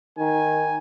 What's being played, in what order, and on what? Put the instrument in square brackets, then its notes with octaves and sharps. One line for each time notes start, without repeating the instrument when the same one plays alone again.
[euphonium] D#3 [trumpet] G#5